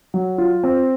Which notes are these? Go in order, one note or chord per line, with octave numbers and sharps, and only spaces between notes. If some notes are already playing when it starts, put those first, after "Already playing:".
F#3
F4
C4